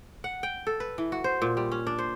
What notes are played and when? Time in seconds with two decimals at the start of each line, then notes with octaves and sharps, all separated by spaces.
0.24 F#5
0.43 G5
0.67 A4
0.80 B4
0.98 E3
1.12 F#4
1.24 C5
1.42 A#2
1.57 G3
1.72 C#4
1.87 D4
1.99 C5